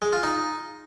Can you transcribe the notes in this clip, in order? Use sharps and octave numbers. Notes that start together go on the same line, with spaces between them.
G#3
F4
D#4